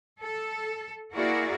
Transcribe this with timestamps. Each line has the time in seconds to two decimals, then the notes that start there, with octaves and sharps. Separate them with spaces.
0.20 A4
1.13 A#3 E4 F#4 G#4 A#4 D5